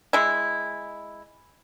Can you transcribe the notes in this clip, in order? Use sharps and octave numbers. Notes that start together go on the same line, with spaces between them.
G#3 E4